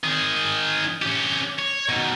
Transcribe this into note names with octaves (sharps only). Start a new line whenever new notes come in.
D#3 G#4
C#4 G4
C#5
B2 D#3